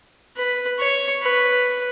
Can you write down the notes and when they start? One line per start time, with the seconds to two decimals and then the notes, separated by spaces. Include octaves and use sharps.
0.37 B4
0.79 C#5
1.22 B4